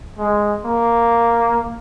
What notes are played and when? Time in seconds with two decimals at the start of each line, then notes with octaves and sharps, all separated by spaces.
0.18 G#3
0.65 A#3